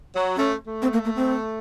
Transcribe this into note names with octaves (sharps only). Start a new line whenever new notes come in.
F#3
A3 C#4
A3
C4
A#3
A#3
C4